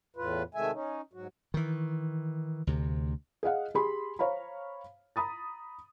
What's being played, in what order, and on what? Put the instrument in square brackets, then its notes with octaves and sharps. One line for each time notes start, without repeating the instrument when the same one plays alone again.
[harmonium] E2 A2 F4 B4
C3 D#3 G#3 A3 E5 G#5
C#4 D#4
G#2 F#3 F#4
[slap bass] D#3 E3
D2 C3
[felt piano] G#4 D#5 F5 F#5
G4 G#4 B5 C6
C5 C#5 F5 A#5 B5
A#5 B5 D#6 A6